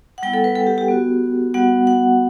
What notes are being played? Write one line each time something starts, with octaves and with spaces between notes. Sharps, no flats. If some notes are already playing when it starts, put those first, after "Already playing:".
F#5
G3 B3 E4 G5
A4
B4
A4
G4
G4
B3 F#4
G3 B3 F#4 F#5
F#5